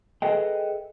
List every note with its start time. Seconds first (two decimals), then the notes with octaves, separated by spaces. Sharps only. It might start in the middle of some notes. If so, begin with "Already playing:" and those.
0.22 G#4 A4 B4 D#5 E5 G5